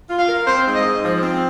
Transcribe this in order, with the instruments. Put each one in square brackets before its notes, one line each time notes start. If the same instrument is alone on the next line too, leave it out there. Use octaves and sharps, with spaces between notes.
[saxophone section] F4
[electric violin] F5
[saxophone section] A#4
[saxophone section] C4 [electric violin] C5
[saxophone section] G#2
[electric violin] D#5
[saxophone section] G#2
F3
C4